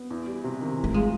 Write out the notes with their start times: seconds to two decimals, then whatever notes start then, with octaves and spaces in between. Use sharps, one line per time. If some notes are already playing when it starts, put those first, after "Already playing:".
Already playing: B3
0.10 E2
0.27 G3
0.44 C3
0.61 D#3
0.77 E3
0.84 A3
0.94 G#3 F4